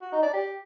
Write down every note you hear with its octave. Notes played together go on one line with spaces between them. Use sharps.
F#4
D#4
D5
G4